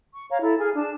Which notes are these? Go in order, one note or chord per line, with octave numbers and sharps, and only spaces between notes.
C#6
C#5 F5 A#5
E4 A4 A#5
G#4 G#5 F6
D4 A5